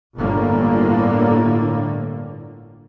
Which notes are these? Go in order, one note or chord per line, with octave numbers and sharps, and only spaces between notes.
G1 A2 D3 A#3